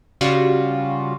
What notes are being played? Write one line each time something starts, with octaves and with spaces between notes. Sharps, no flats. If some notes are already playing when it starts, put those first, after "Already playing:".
C#3 G3 F4 F#4